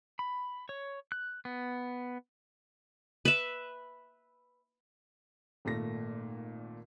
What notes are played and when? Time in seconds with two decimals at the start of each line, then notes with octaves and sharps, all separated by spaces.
0.19 B5
0.69 C#5
1.12 F#6
1.45 B3
3.25 B4 E5
5.65 G#1 A#2 A3 A#6